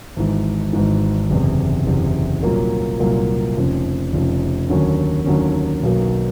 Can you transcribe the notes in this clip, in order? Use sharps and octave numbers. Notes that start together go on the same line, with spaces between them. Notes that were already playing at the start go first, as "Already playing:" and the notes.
G#1 G#2 E3
G#1 G#2 E3
F#1 E2 C3
F#1 E2 C3
C2 A#2 F#3 A#3
C2 A#2 F#3 A#3
F1 F2 C#3
F1 F2 C#3
D#2 D3 F#3 A#3 C#4
D#2 D3 F#3 A#3 C#4
B1 B2 F#3 A#3